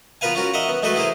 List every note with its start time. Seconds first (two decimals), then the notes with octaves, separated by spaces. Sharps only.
0.21 B3 F4 A#4 B4 F5 G#5
0.35 C#4 F4 F#4 A#4
0.54 A#4 D#5 E5 F#5
0.69 B3
0.83 G#3 A3 F#4 G#4 A4 B4
0.96 E4 G#4 A#4 C5